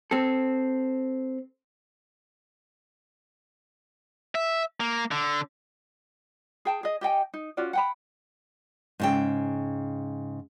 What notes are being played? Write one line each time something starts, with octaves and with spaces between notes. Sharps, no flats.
C4 A4
E5
A#3
D3
G#4 G5 A5
G#4 D#5
G4 D#5 G5 G#5
D#4
C#4 F4 F#4 D5
F#5 G5 B5
G#2 C#3 G5